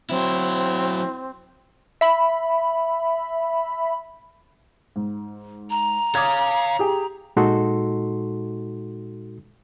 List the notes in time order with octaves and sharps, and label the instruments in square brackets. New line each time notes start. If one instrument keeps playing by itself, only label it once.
[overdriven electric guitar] F#3 E4 [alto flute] C4
[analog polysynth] E5 B5
[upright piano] G#2
[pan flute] A#5
[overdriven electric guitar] C#5 F5 [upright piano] D6 D#6 G#6
[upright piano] G4 G#4 G5
[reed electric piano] A#2 G#3 D#4 F#4 A4 C6